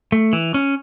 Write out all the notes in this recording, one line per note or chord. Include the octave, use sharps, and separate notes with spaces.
A3
E3
C#4